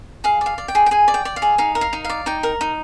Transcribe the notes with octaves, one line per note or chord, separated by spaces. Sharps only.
G#4 F5
D5 F5
D5
G5
G#4
G5
G#4 G#5
D5
G5
D5
F5
G#4
D#4 F5
A#4
F5
D#4
D5 F5
D#4 G5
A#4
D#4